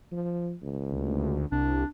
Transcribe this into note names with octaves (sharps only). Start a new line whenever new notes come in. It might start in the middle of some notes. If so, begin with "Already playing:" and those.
F3
C#2
D2
C2 D4